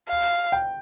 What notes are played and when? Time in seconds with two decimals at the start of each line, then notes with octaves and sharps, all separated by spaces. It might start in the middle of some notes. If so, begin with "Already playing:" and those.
0.09 F5
0.52 G5